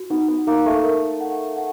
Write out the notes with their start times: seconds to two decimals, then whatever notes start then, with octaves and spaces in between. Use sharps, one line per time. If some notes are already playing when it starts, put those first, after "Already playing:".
Already playing: F#4
0.10 B3 D#4
0.28 B3
0.47 A#3 D#4
0.66 A3
0.84 A#4
1.21 F#5
1.57 F#5